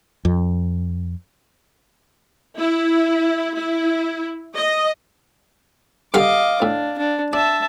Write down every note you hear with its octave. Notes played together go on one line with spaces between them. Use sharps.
F2
E4
E4
D#5
G2 D3 D#5 F5 D6
A2 D4
D4
D4 E5 A5